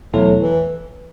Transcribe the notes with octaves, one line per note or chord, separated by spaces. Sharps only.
E2 B2 F#3 A3 E4 A4
E3